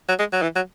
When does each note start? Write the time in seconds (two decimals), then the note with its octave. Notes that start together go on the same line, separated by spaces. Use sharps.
0.09 F#3
0.19 G#3
0.33 F#3
0.42 E3
0.56 F#3